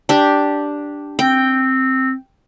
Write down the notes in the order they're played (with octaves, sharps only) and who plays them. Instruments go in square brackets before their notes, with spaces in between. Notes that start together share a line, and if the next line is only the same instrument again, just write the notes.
[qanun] D4 G4
[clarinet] C4 [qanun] G5